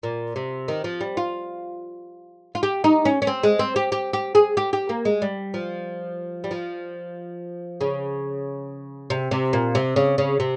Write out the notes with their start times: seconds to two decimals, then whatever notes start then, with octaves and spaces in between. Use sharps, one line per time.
0.03 A#2
0.36 C3
0.68 D#3
0.84 F3
1.01 G3
1.17 F4
2.55 F4
2.63 G4
2.84 D#4
3.05 C#4
3.22 C#4
3.27 C4
3.43 G#3
3.59 C4
3.76 G4
3.92 G4
4.13 G4
4.35 G#4
4.57 G4
4.73 G4
4.89 A#3
5.05 G#3
5.22 G3
5.54 F3
6.44 G3
6.51 F3
7.81 C#3
9.10 C3
9.31 C3
9.53 A#2
9.75 C3
9.96 C#3
10.18 C#3
10.40 C3